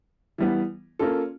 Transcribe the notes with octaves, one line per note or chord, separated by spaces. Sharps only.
E3 G3 B3
A#3 C#4 F4 A4